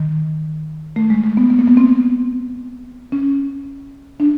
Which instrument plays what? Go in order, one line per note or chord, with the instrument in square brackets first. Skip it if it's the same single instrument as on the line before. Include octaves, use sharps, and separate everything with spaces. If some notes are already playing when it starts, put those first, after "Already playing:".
Already playing: [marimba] D#3
A3
G#3
G#3
B3
B3
A#3
B3
C4
C#4
D4